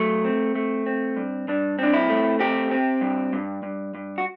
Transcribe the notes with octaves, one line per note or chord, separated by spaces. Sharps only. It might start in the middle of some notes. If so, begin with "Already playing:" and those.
Already playing: F#3 A3
C4
A3
C4
G2
G2 D4
C4 D4
E4
A3
C4 G4
C4
G2
G2
G2
G2
F#4